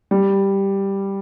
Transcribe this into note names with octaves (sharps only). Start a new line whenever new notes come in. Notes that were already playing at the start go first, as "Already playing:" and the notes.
G3